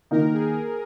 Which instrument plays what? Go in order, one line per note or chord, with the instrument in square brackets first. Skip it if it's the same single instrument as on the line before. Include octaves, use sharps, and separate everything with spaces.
[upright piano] D#3 A#3 D#4 [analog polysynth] A#4
[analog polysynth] G#4